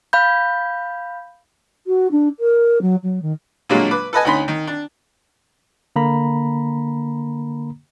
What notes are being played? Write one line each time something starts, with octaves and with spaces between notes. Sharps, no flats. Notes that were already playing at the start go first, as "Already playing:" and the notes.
F5 B5 G6
F#4
D4
A#4
F#3
F#3
D#3
A#2 D3 F#3 G#3 A#3
B4 D6
A4 B4 D#5 G#5
D2 C#4 D#4 B5 C6
D#3
D4
D3 A#3 A#5 B5